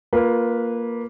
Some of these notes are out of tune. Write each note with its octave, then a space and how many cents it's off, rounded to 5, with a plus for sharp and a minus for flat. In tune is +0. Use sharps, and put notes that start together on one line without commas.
A#3 +0 F4 +0 B4 -15